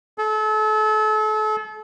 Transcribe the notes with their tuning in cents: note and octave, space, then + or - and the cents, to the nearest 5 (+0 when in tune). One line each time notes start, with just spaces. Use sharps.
A4 -35